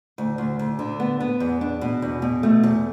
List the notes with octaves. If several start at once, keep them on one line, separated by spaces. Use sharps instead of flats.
D2
D2
D2
D3
B3
B3
E2
D4
B2
E2
B2
A3
E2